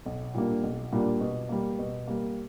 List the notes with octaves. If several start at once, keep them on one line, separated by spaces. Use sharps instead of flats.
B1
A#2 G3 A#3 D4
B1
A#2 G3 A#3 D4
B2
G3 A#3
B2
G3 A#3